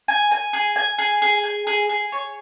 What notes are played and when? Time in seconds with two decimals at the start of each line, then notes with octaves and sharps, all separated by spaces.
0.08 G#5
0.31 G#5
0.53 G#4
0.76 G#5
0.98 G#4
1.22 G#4
1.44 G#5
1.67 G#4
1.89 G#4
2.12 C#5